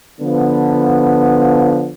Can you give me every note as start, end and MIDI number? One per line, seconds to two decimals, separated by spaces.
0.21 1.91 50
0.21 1.91 53
0.21 1.91 59